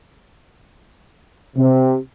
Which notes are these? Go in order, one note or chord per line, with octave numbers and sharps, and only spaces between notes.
C3